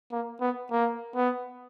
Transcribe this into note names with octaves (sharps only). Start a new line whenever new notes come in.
A#3
B3
A#3
B3